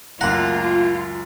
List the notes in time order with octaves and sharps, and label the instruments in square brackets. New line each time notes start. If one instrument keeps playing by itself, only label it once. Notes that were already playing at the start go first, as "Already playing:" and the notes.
[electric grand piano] C#2 F#2 [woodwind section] D#3 A3 A#3 [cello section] F4 [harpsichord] F#5 A#5